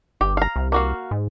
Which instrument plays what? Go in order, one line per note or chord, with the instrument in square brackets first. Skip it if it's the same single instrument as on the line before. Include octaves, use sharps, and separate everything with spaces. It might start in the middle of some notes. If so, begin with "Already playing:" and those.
[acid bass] G1 [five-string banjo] G4
[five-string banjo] F5 A#5
[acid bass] C2
[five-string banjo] A#3 F#4 F5
[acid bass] G#2